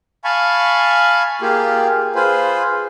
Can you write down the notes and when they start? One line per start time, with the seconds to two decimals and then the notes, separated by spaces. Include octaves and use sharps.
0.24 F5 G#5 A5 B5 C#6
1.42 A#3 F4 G4 G#4
2.15 F4 G#4 B4 C5